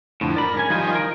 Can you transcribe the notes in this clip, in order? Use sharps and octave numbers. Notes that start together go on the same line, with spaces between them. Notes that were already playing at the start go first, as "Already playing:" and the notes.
F2 A2 D3
A#4 D5 B5
G#2 C#4 G#5
D#3 F3 G3 G#5
A#4